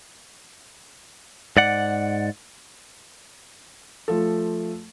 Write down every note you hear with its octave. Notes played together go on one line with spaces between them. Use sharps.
G#2 D5 F#5
F3 A3 F4 A4